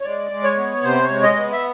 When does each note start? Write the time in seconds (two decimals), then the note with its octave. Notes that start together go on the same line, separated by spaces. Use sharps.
0.01 C#5
0.04 G#3 D5
0.31 G#3
0.44 C#5
0.57 B3
0.83 C3 C5
1.04 C#5
1.10 G#3
1.22 D#5
1.36 B3
1.53 E5